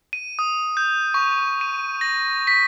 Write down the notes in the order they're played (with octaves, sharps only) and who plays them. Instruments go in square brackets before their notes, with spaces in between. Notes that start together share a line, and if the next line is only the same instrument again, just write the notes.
[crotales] D#7
D#6
G6
C#6
D#7
A#6
B6